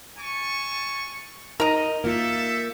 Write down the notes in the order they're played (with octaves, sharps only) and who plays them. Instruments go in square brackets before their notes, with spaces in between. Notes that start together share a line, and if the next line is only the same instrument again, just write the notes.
[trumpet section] G#5 A5 C#6
[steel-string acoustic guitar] D#4 [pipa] A#4 A#5 [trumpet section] D#5
[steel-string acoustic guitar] A#3 F4 [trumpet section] G4 A4 E5